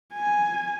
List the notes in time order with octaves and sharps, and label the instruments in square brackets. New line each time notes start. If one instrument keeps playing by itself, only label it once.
[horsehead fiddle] G#5